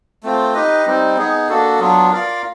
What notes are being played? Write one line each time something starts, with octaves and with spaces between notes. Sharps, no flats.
A3 C4 F4
D#4 G4 B4 D#5
G3 C4 D#4
B3 D#4 G#4
A#3 D4 F#4 A4
F#3 B3 D4 F4
F4 A#4 D5 F5